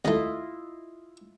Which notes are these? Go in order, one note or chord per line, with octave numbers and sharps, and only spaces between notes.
D#2 A3 E4 F4 D#5